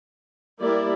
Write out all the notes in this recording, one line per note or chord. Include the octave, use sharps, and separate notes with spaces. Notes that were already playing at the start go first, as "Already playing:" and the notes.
G3 A#3 E4 A#4 D5